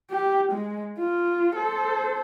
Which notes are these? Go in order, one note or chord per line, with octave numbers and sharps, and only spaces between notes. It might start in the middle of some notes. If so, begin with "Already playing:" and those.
G4
G#3
F4
A4 C5